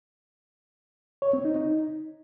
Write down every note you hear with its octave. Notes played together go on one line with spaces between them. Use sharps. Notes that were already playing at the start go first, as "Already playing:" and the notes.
C#5
C4
D#4
D#4